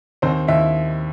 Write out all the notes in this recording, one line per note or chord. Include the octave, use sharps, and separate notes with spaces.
D#2 C4 C5
D#2 E4 E5